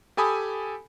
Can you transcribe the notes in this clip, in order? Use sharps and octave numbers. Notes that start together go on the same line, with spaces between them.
G4 A4 G#5 B5 D#6